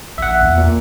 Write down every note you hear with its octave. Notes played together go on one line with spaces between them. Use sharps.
A#1 E5 F#5
E2
A#2